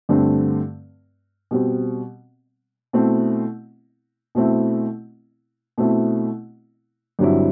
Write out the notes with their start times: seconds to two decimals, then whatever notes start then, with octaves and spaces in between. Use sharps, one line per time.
0.09 G2 D3 A3 C4
1.51 B2 G3 C4
2.93 B2 A3 C4 E4
4.35 B2 A3 C4 E4
5.78 B2 A3 C4 E4
7.19 G2 D3 F#3 C4 E4